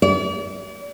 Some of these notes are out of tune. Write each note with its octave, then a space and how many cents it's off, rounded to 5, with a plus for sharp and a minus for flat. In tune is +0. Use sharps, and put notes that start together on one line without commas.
D5 -40